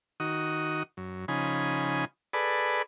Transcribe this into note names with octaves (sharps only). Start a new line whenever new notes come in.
D#3 F#4 D#6
F#2
C#3 F3 D#4 G#5 B5
G#4 A4 B4 D5 B5